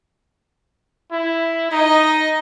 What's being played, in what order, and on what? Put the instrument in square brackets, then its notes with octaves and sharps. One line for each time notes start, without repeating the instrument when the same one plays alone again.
[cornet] E4
[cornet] D#4 [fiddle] D#5